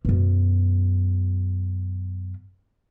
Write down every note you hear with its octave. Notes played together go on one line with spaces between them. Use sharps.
F#2 B2